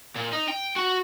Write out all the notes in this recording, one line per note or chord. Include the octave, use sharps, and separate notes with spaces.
A#2
D#4
G5
F#4